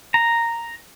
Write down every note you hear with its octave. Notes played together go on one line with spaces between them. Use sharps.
A#5